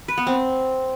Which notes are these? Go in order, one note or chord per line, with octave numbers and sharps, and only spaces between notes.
B4
B3
C4